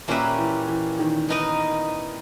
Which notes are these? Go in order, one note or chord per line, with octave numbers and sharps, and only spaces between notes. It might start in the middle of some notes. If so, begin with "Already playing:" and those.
A#2 A#3 C#4 G4 B4 E5
E3
E3
D#3
B3 D#4 A#4 D#5